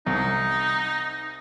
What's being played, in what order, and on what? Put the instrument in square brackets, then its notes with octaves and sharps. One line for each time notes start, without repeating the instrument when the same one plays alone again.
[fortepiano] C2 [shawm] D#4